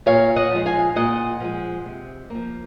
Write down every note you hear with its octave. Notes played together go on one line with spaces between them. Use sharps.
A#2 C#5 F5
D#5 F#5
F3 G#3
F5 G#5
A#2 D#5 F#5
F3 G#3
C3
F3 A#3